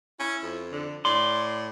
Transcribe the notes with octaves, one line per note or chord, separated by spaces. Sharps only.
C#4 E4
F2
D3
A2 D5 C6